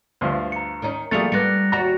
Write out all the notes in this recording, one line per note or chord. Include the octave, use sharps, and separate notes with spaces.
D2 G2 F3
A#5 C#7
D#3 C#4 D#4
F3 G3 A3 A#3 G#4 A6 C#7 F7
G3 B3 F#6 A#6 C#7
D#2 G3 F#4 A#5